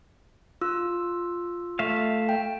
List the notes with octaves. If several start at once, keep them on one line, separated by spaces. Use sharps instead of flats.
F4 E6
A3 E5 F5
G5